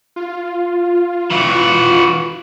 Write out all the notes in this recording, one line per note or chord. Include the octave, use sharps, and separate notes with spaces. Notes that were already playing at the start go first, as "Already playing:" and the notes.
F4
E3 F#4